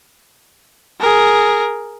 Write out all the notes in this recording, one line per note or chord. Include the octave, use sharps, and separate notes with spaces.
G#4 A#4